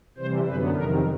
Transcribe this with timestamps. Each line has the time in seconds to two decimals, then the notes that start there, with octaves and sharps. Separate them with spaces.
0.17 C3 E3 G3 C5
0.47 F#2 D3 F#3 B3 B4
0.75 F2 C3 D#3 A#4